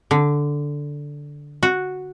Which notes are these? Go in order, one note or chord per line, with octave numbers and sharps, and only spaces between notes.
D3
F#4